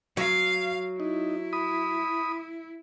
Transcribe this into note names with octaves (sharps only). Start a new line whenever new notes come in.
F#3 F5
D#4 E4
B5 D#6